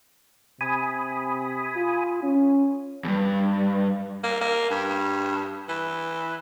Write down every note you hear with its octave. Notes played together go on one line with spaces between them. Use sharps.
C3 G#5 B5 D#6
F4
C#4
E2 G2
A#3
A#3
G2
E3